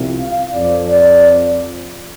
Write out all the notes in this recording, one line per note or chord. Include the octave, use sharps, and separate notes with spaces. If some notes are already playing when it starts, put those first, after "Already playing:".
Already playing: C2 C3 F3
F5
F2 F3 D5
D5